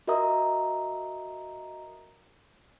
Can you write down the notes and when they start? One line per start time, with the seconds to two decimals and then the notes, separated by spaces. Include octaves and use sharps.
0.08 F#4 A#4 D#5 E5 A#5 D#6